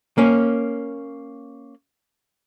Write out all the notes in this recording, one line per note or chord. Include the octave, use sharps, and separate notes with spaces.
A#3 C#4